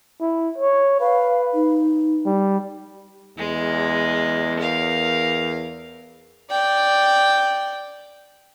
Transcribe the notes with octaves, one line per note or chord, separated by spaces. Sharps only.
E4
C#5
B4 F5
D#4
G3
E2 G#3
A#4 F5
D5 G5